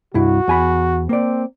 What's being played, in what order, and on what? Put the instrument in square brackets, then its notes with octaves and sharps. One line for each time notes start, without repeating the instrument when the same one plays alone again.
[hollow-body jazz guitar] C2 G2 E4 [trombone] F#4
[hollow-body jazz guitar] E2 G#5 B5
[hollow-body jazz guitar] A#3 D5 [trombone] C4